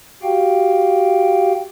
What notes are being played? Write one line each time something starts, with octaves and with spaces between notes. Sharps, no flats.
F#4 G4 F5 G5